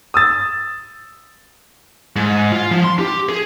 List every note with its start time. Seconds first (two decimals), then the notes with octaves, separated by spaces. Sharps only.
0.14 D#6 E6 A6
2.16 G#2
2.52 F4
2.71 F3
2.84 C6
2.99 G4
3.29 G#4